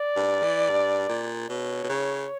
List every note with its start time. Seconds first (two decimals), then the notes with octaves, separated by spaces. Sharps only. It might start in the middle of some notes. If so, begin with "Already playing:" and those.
Already playing: D5
0.16 G2
0.43 E3
0.69 G2
1.09 A#2
1.50 B2 C#5
1.84 B2
1.89 C#3